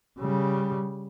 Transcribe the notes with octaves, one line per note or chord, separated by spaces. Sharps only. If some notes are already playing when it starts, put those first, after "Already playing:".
C#3 G3